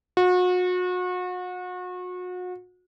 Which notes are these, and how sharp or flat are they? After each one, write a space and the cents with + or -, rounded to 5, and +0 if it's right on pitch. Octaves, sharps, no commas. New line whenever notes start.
F#4 -35